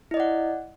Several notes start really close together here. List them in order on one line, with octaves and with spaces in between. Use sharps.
E4 D#5 D5 F#5